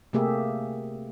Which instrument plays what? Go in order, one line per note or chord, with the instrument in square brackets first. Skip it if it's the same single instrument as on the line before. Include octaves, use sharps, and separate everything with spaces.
[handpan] C3 A3 A#3 G4 G#4 E5